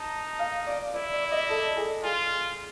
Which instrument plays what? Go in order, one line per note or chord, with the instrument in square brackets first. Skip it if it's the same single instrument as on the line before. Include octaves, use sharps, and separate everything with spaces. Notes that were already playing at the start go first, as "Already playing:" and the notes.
Already playing: [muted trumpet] D#4 [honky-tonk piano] A5
[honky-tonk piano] F5
D5
[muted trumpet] E4 [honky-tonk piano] D5
[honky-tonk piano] D5
D#5
A4
G#4
[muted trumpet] F4 [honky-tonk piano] G#4